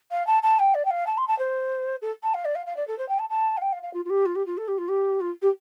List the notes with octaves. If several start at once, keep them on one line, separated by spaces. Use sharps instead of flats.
F5
A5
A5
G5
D5
G5
F5
A5
C6
A5
C5
A4
A5
F5
D5
F5
F5
D5
A4
C5
G5
A5
A5
F5
G5
F5
F5
F4
F4
G4
F4
G4
F4
A4
G4
F4
G4
F4
G4